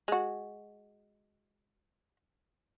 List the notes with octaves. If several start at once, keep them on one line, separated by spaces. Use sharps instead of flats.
G#3 F#4